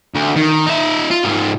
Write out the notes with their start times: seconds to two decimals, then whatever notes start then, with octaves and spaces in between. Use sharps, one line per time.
0.15 D2
0.36 D#3
0.67 D#4 E5
1.10 F4
1.25 G#2 F4